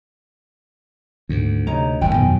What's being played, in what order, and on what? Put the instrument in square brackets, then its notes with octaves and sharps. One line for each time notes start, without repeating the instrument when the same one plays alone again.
[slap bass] D2 [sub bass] G#2
[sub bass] C3 [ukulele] D#4 C#5 A#5
[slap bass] G1 F2 [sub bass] D#3 [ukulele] G5 G#5
[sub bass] F2 [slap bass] B2 D#3 F#3